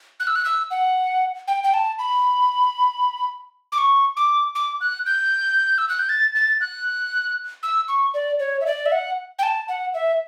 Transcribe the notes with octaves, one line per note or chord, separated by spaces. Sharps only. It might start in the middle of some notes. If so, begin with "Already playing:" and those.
F#6
E6
F#6
E6
F#5
G5
G5
A5
B5
D6
C#6
D6
D6
F#6
G6
E6
F#6
G6
A6
A6
F#6
E6
C#6
D5
C#5
E5
D5
E5
F#5
G5
A5
F#5
E5